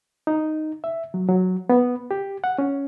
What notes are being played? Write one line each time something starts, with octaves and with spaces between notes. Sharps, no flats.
D#4
E5
F#3
F#3
B3
G4
F#5
C#4